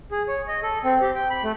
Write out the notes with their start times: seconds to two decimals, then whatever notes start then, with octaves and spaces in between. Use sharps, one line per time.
0.11 G#4
0.28 C#5
0.48 D#5
0.63 A4
0.84 C4
1.01 G4
1.15 G5
1.30 B5
1.43 A3